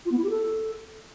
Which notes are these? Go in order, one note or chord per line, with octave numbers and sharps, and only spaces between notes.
F4
B3
E4
G4
A4